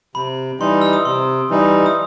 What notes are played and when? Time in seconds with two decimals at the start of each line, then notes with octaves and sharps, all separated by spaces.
0.15 C3 B5
0.60 E3 G3 D#4 C6
0.81 E6
0.93 D#6
1.05 C3 C6
1.50 E3 G3 D#4
1.86 D#6